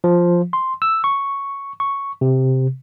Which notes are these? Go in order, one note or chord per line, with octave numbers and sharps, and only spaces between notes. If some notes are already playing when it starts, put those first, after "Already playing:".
F3
C6
E6
C#6
C#6
C3